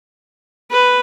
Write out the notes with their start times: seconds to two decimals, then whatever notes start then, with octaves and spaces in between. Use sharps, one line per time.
0.71 B4